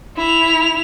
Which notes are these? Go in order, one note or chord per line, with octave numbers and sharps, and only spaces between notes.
E4 F7